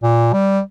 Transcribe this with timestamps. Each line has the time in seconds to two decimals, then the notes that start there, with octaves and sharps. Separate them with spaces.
0.03 A#2
0.33 G3